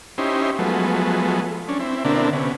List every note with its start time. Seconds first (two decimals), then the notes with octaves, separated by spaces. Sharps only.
0.18 C#4 D#4 E4 G4 C5
0.59 F3 F#3 G#3 A3 B3
1.68 C#4 D4
1.80 C4 E4
2.05 B2 D3 A#3 C4 D4 E4
2.33 C3 B3 C#4